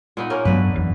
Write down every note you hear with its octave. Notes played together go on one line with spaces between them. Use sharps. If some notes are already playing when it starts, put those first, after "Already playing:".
A#2 B3 D#4
A#3 C#4 A#4
G2 D3 F#3 B3 B4
F#1 E2